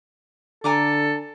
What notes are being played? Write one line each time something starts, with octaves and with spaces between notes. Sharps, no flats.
D3 A4 G#5 A#5 D6